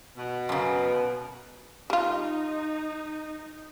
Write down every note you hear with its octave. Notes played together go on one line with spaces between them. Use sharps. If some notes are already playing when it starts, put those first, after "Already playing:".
B2
F#2 C#3
G3 D#4 F4